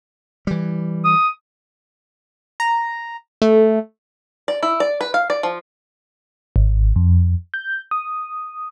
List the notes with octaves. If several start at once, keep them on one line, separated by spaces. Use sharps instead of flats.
E3 G3
D#6
A#5
A3
D5
E4
D5
B4
F5
D5
F3
G#1
F2
G6
D#6